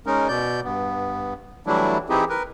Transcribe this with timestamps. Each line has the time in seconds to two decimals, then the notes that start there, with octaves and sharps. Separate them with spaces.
0.06 G#3 C#4 D#4 A#4
0.28 B2 D5 G6
0.64 G2 B3
1.67 E3 F#3 G3 A3 D4 E4
2.09 E3 C4 D#4 E4 G4 G#4
2.29 A#4 B4